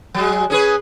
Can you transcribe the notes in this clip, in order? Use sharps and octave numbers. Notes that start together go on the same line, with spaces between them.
F#3 G#3
C#4 G#4 B4